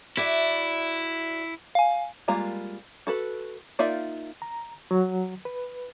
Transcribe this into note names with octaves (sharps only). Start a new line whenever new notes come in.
E4 F#4 D5 E5
F5 G#5
G3 G#3 A#3 F4 A#5
F#4 A4 B4
A#3 D#4 F4 D5 E5
A#5
F#3
B4